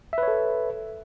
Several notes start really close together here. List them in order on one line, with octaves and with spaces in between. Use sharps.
E5 B4 C#5 A4